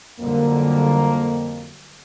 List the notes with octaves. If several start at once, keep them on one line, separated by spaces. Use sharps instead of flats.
F2 D3 F#3 G3 A#3